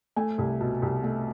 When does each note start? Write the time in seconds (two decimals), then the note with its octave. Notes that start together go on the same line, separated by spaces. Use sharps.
0.16 A3 G#5
0.38 C2
0.60 B2
0.82 C2
1.04 A3